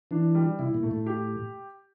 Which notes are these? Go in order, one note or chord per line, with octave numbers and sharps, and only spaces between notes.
E3 D4
G3
C3 E4
A#2
A3
A2
G4